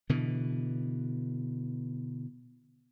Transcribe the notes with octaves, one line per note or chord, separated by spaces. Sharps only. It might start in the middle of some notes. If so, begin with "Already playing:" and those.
B2 D3 E3